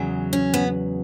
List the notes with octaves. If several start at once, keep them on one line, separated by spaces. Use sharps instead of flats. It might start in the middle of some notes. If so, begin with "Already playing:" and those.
Already playing: E2 C#3 F#3
C#4
B3